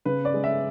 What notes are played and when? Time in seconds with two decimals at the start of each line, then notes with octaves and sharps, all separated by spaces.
0.05 C#3 B4
0.25 D5
0.34 G#3
0.44 E5